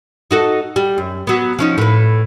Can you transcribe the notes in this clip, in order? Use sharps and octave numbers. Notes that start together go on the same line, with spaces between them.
D#4 F#4 A4
G3
F#2
F#3 B3
F3 C#4 D#4
A2 B4